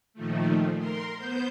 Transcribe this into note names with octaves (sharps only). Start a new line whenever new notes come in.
A#2 D#3 F3 A3
A#4 C6
B3 C5 G6